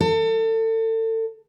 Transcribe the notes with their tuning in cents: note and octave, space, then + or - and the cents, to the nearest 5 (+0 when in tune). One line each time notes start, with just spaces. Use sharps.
A4 +30